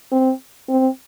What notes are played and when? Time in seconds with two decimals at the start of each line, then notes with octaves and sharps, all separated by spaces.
0.12 C4
0.69 C4